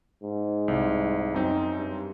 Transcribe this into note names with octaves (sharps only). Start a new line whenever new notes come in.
G#2
C2
F#2 C4 D#4
G2